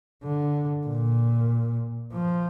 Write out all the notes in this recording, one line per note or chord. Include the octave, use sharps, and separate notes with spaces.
D3
A#2
F3